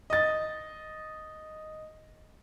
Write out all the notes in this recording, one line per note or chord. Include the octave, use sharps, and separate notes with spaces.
D#5 A6